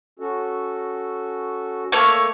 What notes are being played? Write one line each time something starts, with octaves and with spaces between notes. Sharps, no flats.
C#4 F#4 A4
A3 A#3 C#5